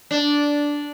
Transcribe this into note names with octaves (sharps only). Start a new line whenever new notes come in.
D4